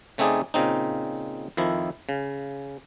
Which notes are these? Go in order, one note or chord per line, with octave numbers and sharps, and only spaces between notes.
C#3 A3 C4 D#4 G#4 D5
A#2 C#3 C4 D#4
F2 D#3 F3 E4
C#3